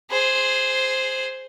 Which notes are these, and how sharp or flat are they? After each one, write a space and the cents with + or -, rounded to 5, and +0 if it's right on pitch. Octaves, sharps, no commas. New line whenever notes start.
G#4 +0 C5 +0